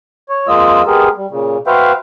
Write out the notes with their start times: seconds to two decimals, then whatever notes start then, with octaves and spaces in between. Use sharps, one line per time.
0.29 C#5
0.47 F2 G#3 A#3 F4 D#5 E6
0.87 G#3 B3 G4 G#4 A#4
1.17 G3
1.30 A#2 C#3
1.67 F#4 B4 C5 E5 F5 G5